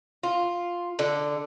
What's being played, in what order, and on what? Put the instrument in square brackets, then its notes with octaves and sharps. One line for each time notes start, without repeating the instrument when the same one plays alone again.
[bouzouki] F4
D3